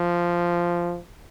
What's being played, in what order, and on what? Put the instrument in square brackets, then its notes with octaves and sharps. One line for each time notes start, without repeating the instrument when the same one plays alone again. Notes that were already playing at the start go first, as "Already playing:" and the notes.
Already playing: [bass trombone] F3